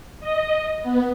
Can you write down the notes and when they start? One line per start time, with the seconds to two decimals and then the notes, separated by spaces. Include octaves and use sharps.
0.20 D#5
0.82 B3